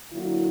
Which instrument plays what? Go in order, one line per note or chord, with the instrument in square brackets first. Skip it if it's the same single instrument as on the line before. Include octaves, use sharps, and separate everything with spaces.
[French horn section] D3 F#3 A#3 E4